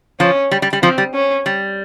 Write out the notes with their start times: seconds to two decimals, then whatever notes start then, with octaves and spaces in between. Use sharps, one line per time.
0.20 F3 C#4
0.52 G3
0.62 G3
0.73 G3
0.82 F3 C4
0.98 G3
1.14 C#4
1.46 G3